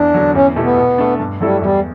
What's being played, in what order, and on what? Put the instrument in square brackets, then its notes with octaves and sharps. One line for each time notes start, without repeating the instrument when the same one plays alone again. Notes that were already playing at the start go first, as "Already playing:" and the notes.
Already playing: [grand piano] E2 [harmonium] D4
[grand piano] D3 F#3
[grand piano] E2 [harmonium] C#4
[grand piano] B2 A3 E4 G4
[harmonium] B3
[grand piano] B2
A3 D4
G2
[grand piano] F#3 A3 E4 A4 [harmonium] G3
[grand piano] E2 [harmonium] G3